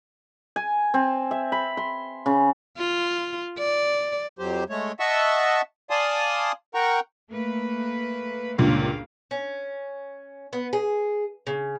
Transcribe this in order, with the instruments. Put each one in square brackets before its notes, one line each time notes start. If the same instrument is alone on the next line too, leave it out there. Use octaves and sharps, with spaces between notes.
[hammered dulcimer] G#5
C4
E5
B5
C6
C#3
[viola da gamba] F4
D5
[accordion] F2 F#3 G4 C5
G#3 A3 C#5
D#5 E5 F#5 A5 C#6 E6
D5 F5 G#5 A5 C6 D#6
A#4 F#5 G5 A#5 C#6
[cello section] A3 A#3 B4
[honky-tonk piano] C#2 G2 A#2 [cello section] C#3 A#3 F5
[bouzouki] C#4
B3
G#4
C#3